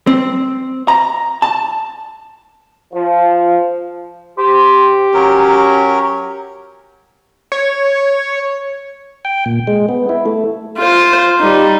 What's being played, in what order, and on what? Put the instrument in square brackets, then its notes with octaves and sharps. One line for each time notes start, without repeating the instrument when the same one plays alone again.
[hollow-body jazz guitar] C4
A#5
A5
[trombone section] F3
[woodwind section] G4 [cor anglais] C5
[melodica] F#3 A#4 [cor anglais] C#4
[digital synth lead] C#5
[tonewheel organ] G5
A#2
G#3
B3
E4
A3
[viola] F4 C5
G3 D#4